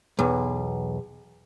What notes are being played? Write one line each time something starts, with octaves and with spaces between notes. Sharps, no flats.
B1 E2